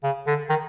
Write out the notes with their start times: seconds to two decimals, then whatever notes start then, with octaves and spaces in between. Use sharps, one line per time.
0.04 C#3
0.27 D3
0.49 D#3